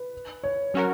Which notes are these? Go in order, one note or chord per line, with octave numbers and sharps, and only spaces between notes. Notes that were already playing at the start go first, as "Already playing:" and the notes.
Already playing: B4
C#5
F#3 C#4 F#4 A#4